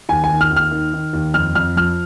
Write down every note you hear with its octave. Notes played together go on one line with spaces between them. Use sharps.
D#2 G#5
G#5
D#3
F6
D#2
F6
D#3
D#3
D#2
F2 F6
F2 F6
F3 F6